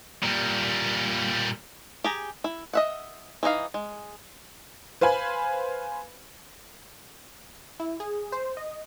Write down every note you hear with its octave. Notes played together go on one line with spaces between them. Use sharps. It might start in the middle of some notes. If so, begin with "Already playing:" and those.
A#2 G3
G4 G#4 A#5
E4
D#5 E5 F#5
E3 D4 D#4 F5
G#3
B4 C5 F5 G#5 B5
E4
G#4
C5
D#5